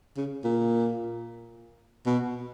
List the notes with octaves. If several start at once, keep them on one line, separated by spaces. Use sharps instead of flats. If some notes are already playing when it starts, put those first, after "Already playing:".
C#3
A#2
B2